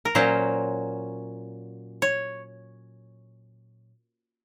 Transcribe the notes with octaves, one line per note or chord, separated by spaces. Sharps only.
A#4
A#2 F#3 C#4 C5
C#5